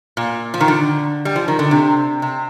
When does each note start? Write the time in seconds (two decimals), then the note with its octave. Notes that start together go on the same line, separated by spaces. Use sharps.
0.17 A#2
0.54 F3
0.60 D#3
0.68 D3
1.25 G3
1.36 F3
1.48 D#3
1.59 D3
1.71 C3
2.22 C3